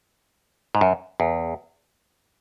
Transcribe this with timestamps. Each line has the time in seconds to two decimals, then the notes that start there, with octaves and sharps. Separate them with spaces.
0.75 G#2
0.81 F#2
1.20 E2